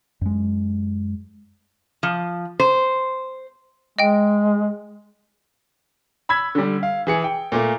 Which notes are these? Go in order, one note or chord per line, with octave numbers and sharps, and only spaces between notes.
F#2 G#3
F3
C5
G#3 D#5 G5
B5 E6 G#6 B6
D3 G3
F5
E3 G#4 C#7
G5
A#2 A3 A#3